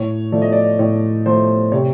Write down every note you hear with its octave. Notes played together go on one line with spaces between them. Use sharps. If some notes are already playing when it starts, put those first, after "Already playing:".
Already playing: A2 C#5
F3 A3 D5
D#5
D5
A2 C#5
F3 A3 C5
C3 C#5